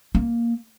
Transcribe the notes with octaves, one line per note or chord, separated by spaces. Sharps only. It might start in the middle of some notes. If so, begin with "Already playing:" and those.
A#3